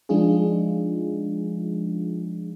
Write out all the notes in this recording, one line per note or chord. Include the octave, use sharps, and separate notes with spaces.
F3 G#3 D4 D#4 F4 G#4